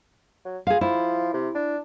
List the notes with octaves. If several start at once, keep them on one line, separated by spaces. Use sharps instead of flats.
F#3
F4 G#4 F5
F3 E4
C3
D4